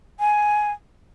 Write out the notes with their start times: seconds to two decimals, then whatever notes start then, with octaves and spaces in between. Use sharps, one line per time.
0.20 G#5